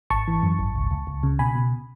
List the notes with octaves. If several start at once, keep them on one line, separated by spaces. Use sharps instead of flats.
G#1 A5 C#6
E3
F#2
G#1
C#2
C#2
C#2
C#3
B2 G#5 B5
B2